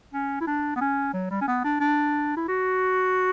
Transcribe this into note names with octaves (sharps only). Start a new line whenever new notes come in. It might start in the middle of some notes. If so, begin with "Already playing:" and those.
C#4
E4
D4
B3
C#4
F#3
G3
C#4
B3
D4
D4
E4
F#4